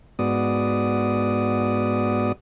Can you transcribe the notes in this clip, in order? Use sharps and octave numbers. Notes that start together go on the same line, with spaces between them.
G#2 B3 F#4 D5 D#6